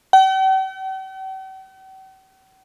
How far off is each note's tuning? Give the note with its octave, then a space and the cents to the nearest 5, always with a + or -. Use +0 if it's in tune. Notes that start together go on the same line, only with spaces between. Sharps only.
G5 -45